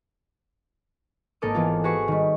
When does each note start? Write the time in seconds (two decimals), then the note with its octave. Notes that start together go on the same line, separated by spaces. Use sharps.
1.42 G#1 A#3 A4 A#4 D6 D#6
1.54 E3 B3 F4
1.84 F#4 G#4 B4 C#6
2.08 D#3 G3